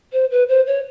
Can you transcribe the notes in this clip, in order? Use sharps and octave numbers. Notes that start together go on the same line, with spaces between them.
C5
B4
C5
C#5